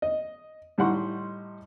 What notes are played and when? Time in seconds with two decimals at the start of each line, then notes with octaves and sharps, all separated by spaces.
0.02 D#5
0.78 A2 G3 D#4 F#5 C6 C#6